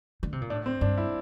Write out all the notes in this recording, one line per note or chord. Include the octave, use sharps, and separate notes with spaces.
D3
C3
A#2
A2 D4
C4
G2 D4
E4